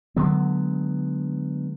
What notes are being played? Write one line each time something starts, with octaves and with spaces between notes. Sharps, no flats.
D3 F#3 G#3 B3